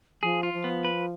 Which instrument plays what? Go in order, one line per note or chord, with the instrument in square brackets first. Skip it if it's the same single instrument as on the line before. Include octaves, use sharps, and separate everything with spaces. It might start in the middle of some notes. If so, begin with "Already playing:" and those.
[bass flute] F3 [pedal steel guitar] G#4
[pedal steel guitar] F4
[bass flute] F3
[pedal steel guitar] B3
B4